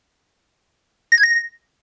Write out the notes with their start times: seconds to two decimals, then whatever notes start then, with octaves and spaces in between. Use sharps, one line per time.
1.12 A#6
1.18 G#6
1.23 A#6